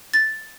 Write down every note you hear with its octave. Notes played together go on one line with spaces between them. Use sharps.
A6